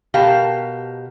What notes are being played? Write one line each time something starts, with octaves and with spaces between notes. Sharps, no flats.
B2 G4 A#4 F5 A5